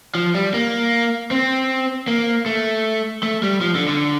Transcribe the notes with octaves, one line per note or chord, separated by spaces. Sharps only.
F3
G3
A#3
C4
A#3
A3
A3
G3
F3
D3
D3